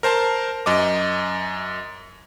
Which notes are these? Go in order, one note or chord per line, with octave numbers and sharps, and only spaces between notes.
A#4 C5 A5 C6
F#2 D#5 D6